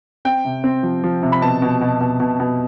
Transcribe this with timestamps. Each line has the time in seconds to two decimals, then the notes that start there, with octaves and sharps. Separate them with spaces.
0.25 C4 G5
0.45 C3
0.64 C4
0.83 F3
1.04 F3
1.23 C3
1.32 B5
1.42 B2 A5
1.62 B2
1.81 B2
2.01 B2
2.20 B2
2.40 B2